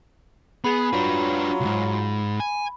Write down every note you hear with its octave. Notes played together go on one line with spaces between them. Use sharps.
B3 G#4 B5
F#3 D4 F4 B4
C2 G#2
G#5